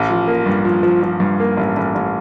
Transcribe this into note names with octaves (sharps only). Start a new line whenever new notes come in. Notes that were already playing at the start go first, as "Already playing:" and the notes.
Already playing: A1
F3
A#3
G2
F3
F3
F3
G2
A#3
A1
A1
A1